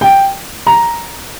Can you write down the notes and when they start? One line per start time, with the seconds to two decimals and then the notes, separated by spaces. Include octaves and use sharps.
0.01 G5
0.67 A#5